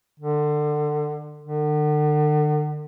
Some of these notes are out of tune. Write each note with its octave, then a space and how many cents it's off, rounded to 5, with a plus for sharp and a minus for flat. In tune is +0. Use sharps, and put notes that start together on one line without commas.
D3 +25
D3 +40